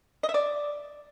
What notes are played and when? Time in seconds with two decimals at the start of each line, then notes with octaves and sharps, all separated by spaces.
0.23 D#5
0.29 E5
0.34 D5